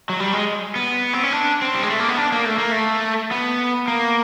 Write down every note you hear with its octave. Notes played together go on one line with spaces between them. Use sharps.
F#3
G3
G#3
B3
C4
C#4
D4
C4
G3
G#3
A3
A#3
B3
D4
A#3
A3
A#3
A3
B3
A#3